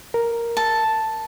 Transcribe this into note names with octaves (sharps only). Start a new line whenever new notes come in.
A#4
A5